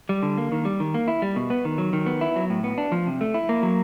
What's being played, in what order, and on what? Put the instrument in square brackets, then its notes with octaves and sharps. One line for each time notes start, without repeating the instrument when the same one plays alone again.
[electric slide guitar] G3
D3
A#3
D#3
G3
D#3
A#3
E4
G3
B2
B3
D#3
F#3
D#3
B3
E4
F#3
A2
B3
D4
F3
C3
A3
E4
A#3
F#3